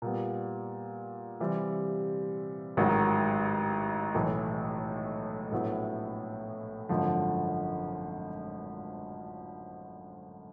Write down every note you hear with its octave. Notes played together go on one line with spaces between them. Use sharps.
A#2 G3 B3
C3 E3 G3 C4
A1 G#2 D#3 F#3
B1 A2 E3
A#1 A2 F#3 B3 E4
G#1 F#2 D3 F3